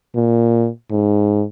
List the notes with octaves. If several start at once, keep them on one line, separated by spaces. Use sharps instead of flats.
A#2
G#2